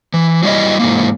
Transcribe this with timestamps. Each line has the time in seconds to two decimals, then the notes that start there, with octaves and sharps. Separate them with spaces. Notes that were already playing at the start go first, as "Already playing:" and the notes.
0.14 E3
0.43 F#3 G3 E4 C#5 D#5
0.79 G#2 D#3 E3 A#3